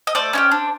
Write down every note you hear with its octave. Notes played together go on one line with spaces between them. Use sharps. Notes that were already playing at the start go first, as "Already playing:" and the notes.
D#5
A3 C5 D5
C#4 E4 G4
D4